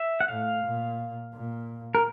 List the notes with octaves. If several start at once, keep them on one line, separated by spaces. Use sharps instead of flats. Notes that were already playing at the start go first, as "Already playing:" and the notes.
Already playing: E5
F#5
A2 F5
A#2
A#2
A#4